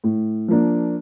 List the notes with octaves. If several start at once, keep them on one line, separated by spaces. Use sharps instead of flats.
A2
F3 A#3 D4